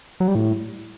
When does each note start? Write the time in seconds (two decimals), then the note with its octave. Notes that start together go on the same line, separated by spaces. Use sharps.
0.20 F#3
0.28 G3
0.35 A2